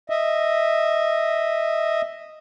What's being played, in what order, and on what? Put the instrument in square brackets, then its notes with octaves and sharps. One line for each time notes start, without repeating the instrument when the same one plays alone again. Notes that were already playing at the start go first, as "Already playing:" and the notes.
[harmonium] D#5 E5